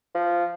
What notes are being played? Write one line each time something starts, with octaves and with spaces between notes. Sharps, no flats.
F3